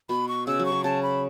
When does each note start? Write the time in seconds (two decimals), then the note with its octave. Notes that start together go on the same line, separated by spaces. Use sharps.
0.09 B2 B5
0.28 C#6
0.47 C#3 E6
0.59 F#3
0.66 C#6
0.72 C#3
0.84 C#3 A5
1.03 B5